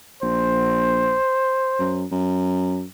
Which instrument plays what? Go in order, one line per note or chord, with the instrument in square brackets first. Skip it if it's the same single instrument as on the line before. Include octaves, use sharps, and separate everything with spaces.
[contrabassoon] A#1 [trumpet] C5
[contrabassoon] F#2
F#2